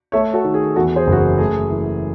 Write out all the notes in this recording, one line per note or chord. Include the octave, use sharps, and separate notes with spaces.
A3 C#5 E5
F#4 A4
D#3
G#4
E2 F#4 A4
G#4 C5
F#1
F#4
G#4
A3 G#4
E3